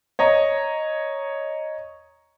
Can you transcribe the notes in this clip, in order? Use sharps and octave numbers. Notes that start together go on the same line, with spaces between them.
C#5 D#5 A#5